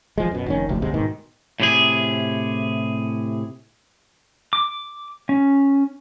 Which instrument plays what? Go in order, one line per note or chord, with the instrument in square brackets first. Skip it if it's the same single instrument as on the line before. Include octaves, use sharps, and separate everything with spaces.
[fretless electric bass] F3 G#3
F#2 B2
F1 D#3 C#4
F1 D2 C3
D2 C3 G#3
G#2 B2 D#3
[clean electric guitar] A2 C3 G#4
[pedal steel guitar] D6
C#4